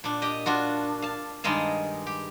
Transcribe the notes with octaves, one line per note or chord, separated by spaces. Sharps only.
A#2 D4
G4 D#5
D4 F4 F#4
F5 A5
G2 D#3 G#3 D#5 F5 A5
G4